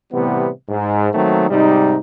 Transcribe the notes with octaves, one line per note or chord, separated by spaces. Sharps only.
A2 C3 E3 G3 B3
G#2
D#3 F#3 A3 A#3 C4 D#4
G#2 C3 G3 D#4